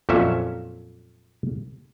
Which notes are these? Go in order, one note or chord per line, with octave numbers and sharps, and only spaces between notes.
F2 A#2 F#3 C#4 E5